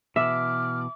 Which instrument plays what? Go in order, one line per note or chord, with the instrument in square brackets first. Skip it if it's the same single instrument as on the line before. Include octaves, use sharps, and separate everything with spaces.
[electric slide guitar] B2 E3 [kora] E5 [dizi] D6 [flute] F6